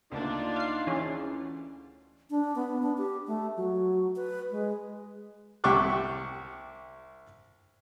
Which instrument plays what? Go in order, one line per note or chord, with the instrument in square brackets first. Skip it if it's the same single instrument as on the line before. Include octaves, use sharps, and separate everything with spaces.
[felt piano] D2 A#3 [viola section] D4 F4 [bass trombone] D#4
[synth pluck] F5 C7
E3 C#4 G#4
[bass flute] D4
B3
D4
G4
A3
F#3
B4
G#3
[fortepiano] C2 G4 F#5 C#6 D6 F#6